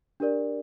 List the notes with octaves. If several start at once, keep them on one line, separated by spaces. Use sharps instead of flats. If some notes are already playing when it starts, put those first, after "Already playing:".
D4 G4 A#4 D5